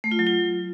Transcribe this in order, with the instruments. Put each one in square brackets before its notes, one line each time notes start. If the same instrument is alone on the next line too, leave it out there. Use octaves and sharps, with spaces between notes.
[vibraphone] A3
F4
F#3
F4